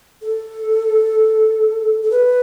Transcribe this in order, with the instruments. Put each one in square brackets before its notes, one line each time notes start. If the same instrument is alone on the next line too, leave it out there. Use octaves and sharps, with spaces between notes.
[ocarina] A4
A4
B4